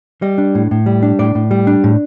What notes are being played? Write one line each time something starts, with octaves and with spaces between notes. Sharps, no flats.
G3 D#5
D4
A2
A2
G3
D4
A2 D5
A2
G3
D4
A2